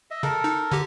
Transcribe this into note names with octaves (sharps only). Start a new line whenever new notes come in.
D#5 E5
C#3 A4 A#4
D#4
D3 G4